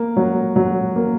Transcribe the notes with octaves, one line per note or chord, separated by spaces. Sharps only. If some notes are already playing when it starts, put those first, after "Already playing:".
Already playing: A#3
F#3
F#3
A#3